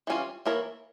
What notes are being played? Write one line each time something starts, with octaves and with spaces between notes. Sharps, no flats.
E3 G3 C#4 F4
E3 A#3 E4 A#4 C#5